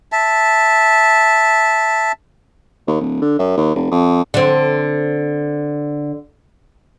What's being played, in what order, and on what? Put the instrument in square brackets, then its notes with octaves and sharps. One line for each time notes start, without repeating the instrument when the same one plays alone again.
[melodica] E5 A5
[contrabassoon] D#2
D1
D3
F#2
D#2
F1
F2
[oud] D3 C4